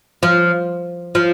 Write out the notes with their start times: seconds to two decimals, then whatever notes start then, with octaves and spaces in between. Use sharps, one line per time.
0.23 F3
1.15 F3